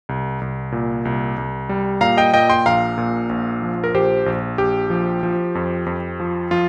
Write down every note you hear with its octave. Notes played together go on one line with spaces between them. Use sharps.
C2
C2
A#2
C2
C2
G3
A#2 F5 A#5
D#5 G5
A#2 D#5 G5
G5 C6
A#1 F5 A#5
A#2
A#1
F3
A#4
A#1 G4 C5
A#1
A#1 G4
F3
F3
F2
F2
F3
F3 F4